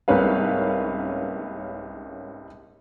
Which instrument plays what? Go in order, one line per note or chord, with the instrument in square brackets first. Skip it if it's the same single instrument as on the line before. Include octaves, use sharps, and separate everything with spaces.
[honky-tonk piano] C2 G#2 A#3 C#4 B4 F5